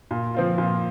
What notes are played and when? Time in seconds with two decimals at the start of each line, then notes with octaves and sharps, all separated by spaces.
0.11 A#2
0.34 F3 C4 F4
0.58 A#2